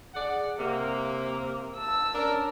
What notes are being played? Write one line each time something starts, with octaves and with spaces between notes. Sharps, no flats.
G#4 D5 F#5
C3 A#3
A5 E6
C#4 D4 A#4